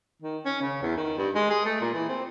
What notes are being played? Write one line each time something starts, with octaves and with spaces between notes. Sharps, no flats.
D#3
C#4
C#3
E2
D#3
G2
G#3
G#4
A3
A#2
E3
C4